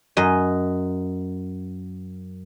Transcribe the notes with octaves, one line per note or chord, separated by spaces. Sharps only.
F#2 D#5